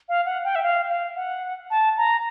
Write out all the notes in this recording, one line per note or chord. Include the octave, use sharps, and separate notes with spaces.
F5
F#5
G5
E5
F5
F5
F#5
A5
A#5